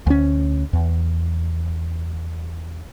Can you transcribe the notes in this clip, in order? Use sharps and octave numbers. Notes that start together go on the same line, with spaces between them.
D2 C#4
E2